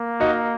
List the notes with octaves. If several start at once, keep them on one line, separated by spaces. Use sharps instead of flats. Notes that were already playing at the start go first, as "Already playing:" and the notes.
Already playing: A#3
D#4 F#4